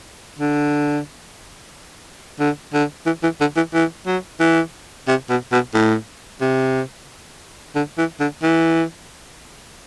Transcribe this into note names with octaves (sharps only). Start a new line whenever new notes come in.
D3
D3
D3
E3
E3
D3
E3
E3
F#3
E3
C3
B2
B2
A2
C3
D3
E3
D3
E3